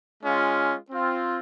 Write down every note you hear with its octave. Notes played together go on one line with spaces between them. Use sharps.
G#3 C#4 F4
C4 F4